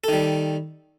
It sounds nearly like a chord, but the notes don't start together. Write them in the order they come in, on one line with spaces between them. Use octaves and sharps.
A4 D#3 G3